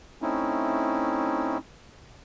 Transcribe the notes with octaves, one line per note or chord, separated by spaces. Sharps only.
A3 C4 C#4 D#4 E4